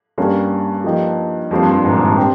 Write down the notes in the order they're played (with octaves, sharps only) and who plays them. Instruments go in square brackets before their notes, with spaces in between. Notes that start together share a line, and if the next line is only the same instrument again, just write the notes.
[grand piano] G2 [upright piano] G3 A#3 C#4
[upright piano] F3 A#3 D#4 G4
[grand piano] F2 [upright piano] G3 A#3 F4 C5
[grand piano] G2
G2
G#1 G#2
A#1 A#2
G#1 G#2
G2
[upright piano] C4 G4